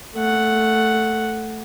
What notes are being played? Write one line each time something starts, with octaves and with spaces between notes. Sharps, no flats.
A3 F#5